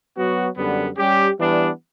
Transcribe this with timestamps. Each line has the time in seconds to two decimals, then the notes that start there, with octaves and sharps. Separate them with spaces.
0.17 F#3 B3 F#4
0.58 F#2 D3 G3 B3
0.98 G3 C#4 G4
1.38 E3 G3 B3 D4